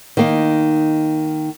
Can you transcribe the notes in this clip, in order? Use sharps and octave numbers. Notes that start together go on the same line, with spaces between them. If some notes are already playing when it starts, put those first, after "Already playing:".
D#3 A#3 D#4